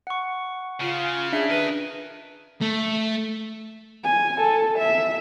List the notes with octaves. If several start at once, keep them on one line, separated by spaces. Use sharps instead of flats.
F#5 C#6
C#3 F4
D4 G#4 E5
A#4 B4 D#5
A3
G#5
A4
E5